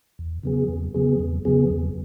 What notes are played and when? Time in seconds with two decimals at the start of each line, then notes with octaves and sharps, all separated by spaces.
0.19 E2
0.43 C#3 F#3 B3 G#4
0.69 E2
0.94 C#3 F#3 B3 G#4
1.19 E2
1.45 C#3 F#3 B3 G#4
1.70 E2